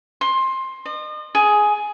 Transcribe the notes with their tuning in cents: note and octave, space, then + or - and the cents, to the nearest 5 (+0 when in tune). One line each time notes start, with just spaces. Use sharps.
C6 +20
D#5 -40
G#4 +10